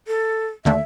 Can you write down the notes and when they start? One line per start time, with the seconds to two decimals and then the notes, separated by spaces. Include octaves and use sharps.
0.08 A4
0.65 D#2 D3 A3 E5